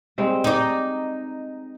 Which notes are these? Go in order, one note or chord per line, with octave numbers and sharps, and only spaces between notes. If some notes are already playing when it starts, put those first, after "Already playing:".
G3 G#3 C4
D#4 D5